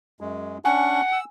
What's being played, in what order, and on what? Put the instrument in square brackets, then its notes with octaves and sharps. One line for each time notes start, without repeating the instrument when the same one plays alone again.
[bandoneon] F#2 G#3
[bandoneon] C#4 D4 C#6 [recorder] F#5 [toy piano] G#5
[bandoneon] E6